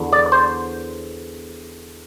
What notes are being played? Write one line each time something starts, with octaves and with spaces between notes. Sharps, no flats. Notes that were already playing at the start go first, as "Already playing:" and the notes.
Already playing: E2 D3
D5
C5